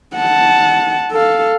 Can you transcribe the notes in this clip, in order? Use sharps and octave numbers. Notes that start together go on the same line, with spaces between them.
F#5 A5
A4 F5